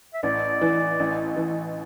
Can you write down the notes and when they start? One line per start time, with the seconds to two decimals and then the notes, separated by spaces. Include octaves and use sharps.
0.14 E5
0.23 A1 D5
0.61 E3
1.00 A1
1.37 E3